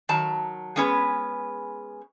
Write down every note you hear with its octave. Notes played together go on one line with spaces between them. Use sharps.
D#3 F#3 A5 A#5
G#3 B3 C#4 G#4 B4